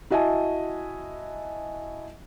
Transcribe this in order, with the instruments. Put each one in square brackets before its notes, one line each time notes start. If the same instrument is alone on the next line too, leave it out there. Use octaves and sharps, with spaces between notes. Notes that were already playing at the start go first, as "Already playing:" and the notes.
[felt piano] E4 F#4 D#5 E5 G#5 A5